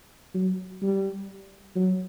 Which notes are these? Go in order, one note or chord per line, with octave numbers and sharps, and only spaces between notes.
F#3
G3
F#3